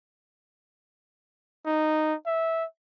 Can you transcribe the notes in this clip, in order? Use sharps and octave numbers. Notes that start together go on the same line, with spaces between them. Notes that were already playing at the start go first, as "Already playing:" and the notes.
D#4
E5